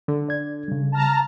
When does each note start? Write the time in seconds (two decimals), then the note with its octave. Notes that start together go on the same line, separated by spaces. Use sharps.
0.08 D3
0.28 D5 G#6
0.68 C#3 G3
0.92 A5 A#5 F6